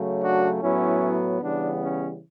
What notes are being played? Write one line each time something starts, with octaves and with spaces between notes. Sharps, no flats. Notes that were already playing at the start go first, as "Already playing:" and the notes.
Already playing: C#3 F#3 A3
D4 F#4
A2 F#3 B3 C#4 E4
C#3 E3 G3 B3 D4
C#4